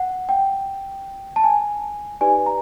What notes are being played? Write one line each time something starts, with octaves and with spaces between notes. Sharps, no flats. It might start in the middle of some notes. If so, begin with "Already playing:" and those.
Already playing: F#5
G5
A5
G#5
D#4 G4 B4 D5 G#5
A#5